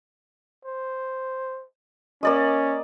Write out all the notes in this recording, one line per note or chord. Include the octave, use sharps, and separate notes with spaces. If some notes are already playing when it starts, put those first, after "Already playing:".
C5
A#3 C#4 D5 D#5